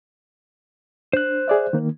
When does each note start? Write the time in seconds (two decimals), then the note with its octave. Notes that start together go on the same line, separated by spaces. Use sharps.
1.13 D4 C5 F#6
1.48 G#4 D5 E5
1.73 D#3 A#3